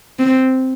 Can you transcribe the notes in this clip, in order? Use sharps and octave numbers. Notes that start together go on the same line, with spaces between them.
C4